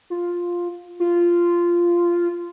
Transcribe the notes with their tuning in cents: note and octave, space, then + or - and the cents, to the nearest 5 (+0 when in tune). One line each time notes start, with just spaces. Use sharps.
F4 +5
F4 -10